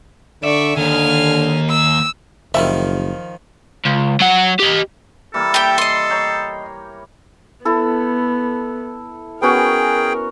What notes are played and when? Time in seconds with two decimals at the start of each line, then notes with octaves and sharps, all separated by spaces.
0.44 D3 D5 E5 C#6
0.77 D#2 D3 D#3 G#5 F6
1.70 E6
2.54 F#1 D#3 F3 G3 E5
3.85 C#2
4.21 F#3 F#5
4.60 G4 D#5
5.34 E3 G3 A#3 A4
5.54 G4 G5
5.78 D#5 C6
6.10 C#5 G5 A#5
7.65 B3 E4 A4
9.42 B3 C#4 F#4 G#4 A#4 G5